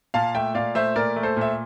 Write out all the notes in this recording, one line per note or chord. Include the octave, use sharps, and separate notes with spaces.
A#2 F5 A5
A3 E5 G5
A#2 D5 F5
A3 C5 E5
A#2 A#4 D5
A3
A4 C5
A#2 E5